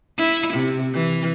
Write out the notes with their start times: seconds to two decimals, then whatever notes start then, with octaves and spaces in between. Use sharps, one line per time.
0.18 E4
0.53 C3
0.94 E3